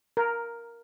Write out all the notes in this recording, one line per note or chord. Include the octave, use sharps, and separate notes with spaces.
A#4